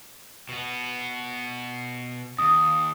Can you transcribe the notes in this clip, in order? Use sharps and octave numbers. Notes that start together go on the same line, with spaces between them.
B2 B3
D#2 D#6